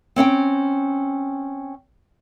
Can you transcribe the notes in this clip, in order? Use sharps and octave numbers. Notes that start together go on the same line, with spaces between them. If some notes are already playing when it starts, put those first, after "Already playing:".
C4 C#4 F#5 G5